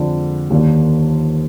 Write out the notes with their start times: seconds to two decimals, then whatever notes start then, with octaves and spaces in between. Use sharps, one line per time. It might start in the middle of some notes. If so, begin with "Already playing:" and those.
Already playing: F2 D3 G#3 D4
0.50 D#2 D#3 A#3 D4